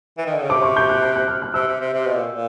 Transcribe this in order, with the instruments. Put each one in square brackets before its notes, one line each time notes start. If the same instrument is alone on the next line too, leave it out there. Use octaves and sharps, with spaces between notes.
[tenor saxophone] E3
D#3
D3
C#3
[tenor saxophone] C3 [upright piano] D6
[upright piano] C#6
G6
F#6
G6
F#6
F6
F#6
[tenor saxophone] C3 [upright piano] E6
[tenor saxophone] C3
C3
C3
B2
A#2
A#2